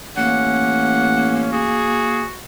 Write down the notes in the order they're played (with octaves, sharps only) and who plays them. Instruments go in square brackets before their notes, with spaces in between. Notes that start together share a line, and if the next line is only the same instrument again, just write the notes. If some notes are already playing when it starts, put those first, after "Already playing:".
[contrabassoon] A1 [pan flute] A#3 [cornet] C#4 [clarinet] F#5
[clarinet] F#4 [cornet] G#4